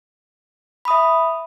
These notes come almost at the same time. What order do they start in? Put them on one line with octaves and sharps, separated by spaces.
B5 D#6 E5